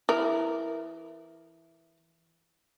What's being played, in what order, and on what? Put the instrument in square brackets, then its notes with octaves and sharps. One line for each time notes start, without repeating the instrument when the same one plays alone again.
[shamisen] E3 A#4